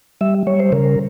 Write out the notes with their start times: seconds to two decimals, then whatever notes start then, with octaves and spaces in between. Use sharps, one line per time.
0.21 G3 E5
0.47 G3 C#5
0.60 C5
0.72 C#3 A#4